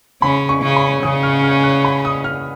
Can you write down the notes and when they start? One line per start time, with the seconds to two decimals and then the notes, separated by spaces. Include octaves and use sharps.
0.22 C#3 C#4 B5
0.49 C#6
0.62 C#3 C#4
0.76 B5
1.03 C#3 C#4 D#6
1.23 F6
1.44 F6
1.64 F#6
1.85 B5
2.05 D#6
2.24 F6